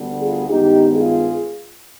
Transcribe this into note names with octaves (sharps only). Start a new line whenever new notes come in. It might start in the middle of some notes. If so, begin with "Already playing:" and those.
Already playing: D2 D3 G3 B3
F4 G#4
G2 D#3 G#3 B3 D#4 G4
F4 G#4